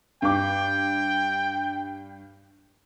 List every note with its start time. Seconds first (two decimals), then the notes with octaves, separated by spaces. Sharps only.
0.22 G2 G5 D6